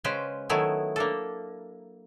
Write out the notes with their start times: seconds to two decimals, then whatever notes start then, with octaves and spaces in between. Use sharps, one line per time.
0.04 C#3 G#3 C#4 B4 C5 G5
0.49 D#3 F#3 A3 B3 E4 G#4
0.96 A#3 D4 A4